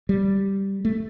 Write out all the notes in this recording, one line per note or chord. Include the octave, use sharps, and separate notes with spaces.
G3
A3